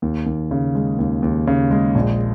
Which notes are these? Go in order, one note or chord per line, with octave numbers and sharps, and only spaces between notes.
D#2
D#2
C#3
G#3
D#2
D#2
C#3
G#3
A#1